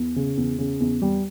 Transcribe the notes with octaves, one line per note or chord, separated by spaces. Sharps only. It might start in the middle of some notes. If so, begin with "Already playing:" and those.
Already playing: E2
C#3
E2
C#3
E2
G3